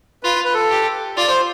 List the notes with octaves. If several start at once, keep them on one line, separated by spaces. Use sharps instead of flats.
F4 B4
B4
A4
G4
F4 D5
C5